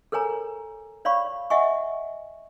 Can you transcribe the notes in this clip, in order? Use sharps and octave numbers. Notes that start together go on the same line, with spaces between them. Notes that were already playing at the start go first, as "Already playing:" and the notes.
A4 A#4 C#5 G#5 A#5
C#5 D5 F5 B5 C#6
D#5 E5 F#5 G#5 C#6